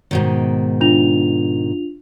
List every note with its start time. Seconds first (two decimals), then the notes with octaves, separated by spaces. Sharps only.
0.11 G#2 B2 D#3
0.81 D4 F4 F7